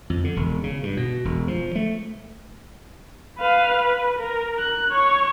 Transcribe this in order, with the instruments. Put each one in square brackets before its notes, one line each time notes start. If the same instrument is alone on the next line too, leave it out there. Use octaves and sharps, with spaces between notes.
[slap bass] F2
D3
E1
C#3
G2
B2
E1
F3
A3
[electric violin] B4 F5
B4
A#4
F#6
C#5 C#6